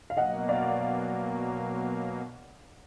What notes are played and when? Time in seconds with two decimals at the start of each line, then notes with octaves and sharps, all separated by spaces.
0.10 F5
0.17 B2 F#3 A#3 D#5 F#5
0.49 D5 F5